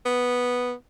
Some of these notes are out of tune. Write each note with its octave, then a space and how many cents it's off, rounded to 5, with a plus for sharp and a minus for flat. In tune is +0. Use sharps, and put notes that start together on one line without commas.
B3 -5